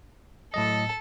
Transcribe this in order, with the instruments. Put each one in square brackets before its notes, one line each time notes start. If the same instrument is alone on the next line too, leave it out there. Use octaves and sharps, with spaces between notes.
[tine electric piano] A2 F#3 D#5 [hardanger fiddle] A4 A5